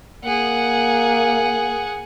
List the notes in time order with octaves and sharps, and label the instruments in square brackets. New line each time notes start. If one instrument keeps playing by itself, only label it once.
[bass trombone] A#3 [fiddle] G#4 F#5